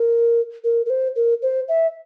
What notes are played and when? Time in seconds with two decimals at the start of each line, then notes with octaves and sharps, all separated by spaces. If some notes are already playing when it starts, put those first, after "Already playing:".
Already playing: A#4
0.64 A#4
0.86 A#4
0.90 C5
1.16 A#4
1.42 C5
1.68 E5